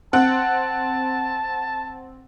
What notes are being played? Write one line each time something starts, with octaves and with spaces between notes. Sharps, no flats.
C4 F#5 A5 F#6